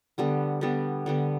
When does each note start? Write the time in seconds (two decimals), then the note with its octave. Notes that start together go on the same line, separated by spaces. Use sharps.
0.18 D3 G3 B3
0.61 D3 G3 B3
1.06 D3 G3 B3